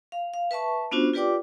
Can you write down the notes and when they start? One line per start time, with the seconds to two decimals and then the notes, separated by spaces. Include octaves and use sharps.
0.12 F5
0.34 F5
0.51 B4 E5 A5 C#6
0.92 B3 C#4 D4 F4 F#4 C5
1.13 F4 G4 B4 D5 G5 D6